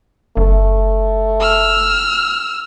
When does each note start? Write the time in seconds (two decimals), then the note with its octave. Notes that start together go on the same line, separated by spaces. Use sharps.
0.37 F#1 A3
1.40 E6 F6